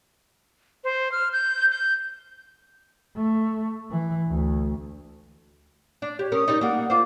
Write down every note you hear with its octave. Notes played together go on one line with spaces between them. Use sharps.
C5
F6
G6
G6
A3
E3
D2
D4
G4 C#5
C#4 A#4 D#6
G3 D#4
G3 A#3 F#5
F4 C5 D6